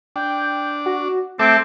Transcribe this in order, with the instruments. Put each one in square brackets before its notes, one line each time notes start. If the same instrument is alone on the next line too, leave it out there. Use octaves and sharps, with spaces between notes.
[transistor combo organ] D4 [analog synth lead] G5
[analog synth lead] F#4
[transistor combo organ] A3 A4 E5 [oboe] C4 [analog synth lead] D6